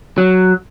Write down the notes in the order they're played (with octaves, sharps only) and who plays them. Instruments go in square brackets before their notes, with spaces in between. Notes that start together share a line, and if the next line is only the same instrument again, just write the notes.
[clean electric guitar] F#3